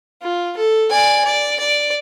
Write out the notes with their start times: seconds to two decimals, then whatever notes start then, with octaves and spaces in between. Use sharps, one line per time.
0.22 F4
0.57 A4
0.90 D5 G#5
1.24 D5
1.59 D5